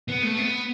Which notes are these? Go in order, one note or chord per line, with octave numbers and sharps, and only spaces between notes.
B3
A3
B3